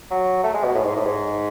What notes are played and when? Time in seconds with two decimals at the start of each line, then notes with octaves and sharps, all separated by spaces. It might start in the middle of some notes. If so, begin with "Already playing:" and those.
0.11 F#3
0.44 A3
0.54 G#3
0.64 B2
0.75 A2
0.85 G#2
0.96 A2
1.06 G#2